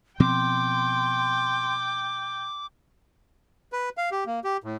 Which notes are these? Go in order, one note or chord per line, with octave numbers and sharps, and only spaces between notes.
B2 F3 C4 G5 C6 D6
B4
F5
G4
A#3
G4
A2